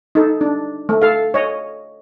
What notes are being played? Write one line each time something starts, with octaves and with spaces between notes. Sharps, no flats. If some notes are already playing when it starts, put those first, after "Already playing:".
D#4 A4
D4
A3
A4 F5
C#5 D#5